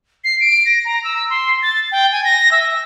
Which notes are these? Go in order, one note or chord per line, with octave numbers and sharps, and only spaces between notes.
C7
D7
A#6
A#5
E6
C6
A6
G5
G#5
A#6
E5